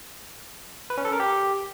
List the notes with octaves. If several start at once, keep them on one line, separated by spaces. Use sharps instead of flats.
B4
C#4
A4
A#4
G4